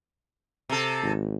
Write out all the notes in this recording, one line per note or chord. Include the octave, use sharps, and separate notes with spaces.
C3 A4
G#1